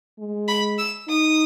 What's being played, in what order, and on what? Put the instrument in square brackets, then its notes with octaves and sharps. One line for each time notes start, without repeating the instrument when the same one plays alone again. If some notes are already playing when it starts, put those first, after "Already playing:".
[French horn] G#3
[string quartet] B5
E6
[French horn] D#4 [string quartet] D#6